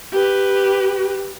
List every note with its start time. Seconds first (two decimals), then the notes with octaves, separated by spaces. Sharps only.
0.13 G4 B4